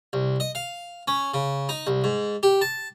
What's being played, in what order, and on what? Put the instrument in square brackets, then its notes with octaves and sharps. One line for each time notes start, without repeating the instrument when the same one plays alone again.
[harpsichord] C2
D#5
F5
C#4
C#3
D#4
C2
G#2
G4
A5